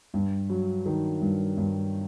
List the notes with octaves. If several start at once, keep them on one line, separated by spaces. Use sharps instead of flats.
G2
F#3
D#3
G2
G2